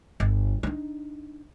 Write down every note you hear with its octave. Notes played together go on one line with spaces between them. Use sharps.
G1
D4 D#4